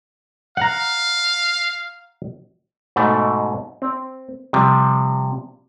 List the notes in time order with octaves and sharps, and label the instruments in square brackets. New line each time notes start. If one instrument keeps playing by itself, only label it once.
[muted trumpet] F5 [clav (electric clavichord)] F#5 A#5
[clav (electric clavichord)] G#2 B2 A3
C4
C3 F3 G3